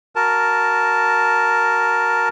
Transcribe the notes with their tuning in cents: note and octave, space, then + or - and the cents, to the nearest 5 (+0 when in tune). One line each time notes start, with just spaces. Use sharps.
F#4 +0 A#4 -5 A5 -5